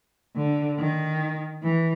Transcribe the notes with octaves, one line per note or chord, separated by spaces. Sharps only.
D3
D#3
E3